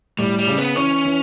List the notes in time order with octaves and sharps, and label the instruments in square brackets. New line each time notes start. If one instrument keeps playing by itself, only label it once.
[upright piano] A2 [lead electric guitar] G3
[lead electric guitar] G3
[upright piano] C#3
[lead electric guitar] B3
[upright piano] E3 [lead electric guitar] C#4
[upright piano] E3